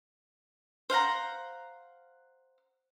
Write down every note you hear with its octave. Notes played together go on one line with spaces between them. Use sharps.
C5 F5 F#5 A#5